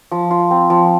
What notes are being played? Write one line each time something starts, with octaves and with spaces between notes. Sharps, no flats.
F3
F4
C4
F3